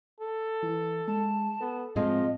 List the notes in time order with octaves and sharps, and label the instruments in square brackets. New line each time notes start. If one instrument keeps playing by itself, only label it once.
[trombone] A4
[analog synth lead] E3
[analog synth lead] G#3 [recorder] A5
[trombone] B3 [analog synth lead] A4
[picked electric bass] A2 G#3 [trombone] F3 [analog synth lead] C4 [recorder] D#5